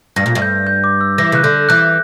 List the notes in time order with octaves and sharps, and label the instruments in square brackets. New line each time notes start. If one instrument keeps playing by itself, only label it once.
[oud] G2 [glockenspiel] A#6
[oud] A#2
G2
[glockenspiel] G6
G6
D6
E6
[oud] E3 [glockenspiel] A#6
[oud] C#3 [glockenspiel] F#6
[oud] D3 [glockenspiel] G6
[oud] E3 [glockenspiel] F#6